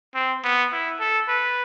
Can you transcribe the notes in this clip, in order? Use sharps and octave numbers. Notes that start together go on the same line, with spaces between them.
C4
B3
E4
A4
B4